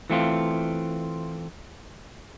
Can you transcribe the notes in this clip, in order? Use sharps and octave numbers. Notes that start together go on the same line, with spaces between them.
E3 A3 C4 F4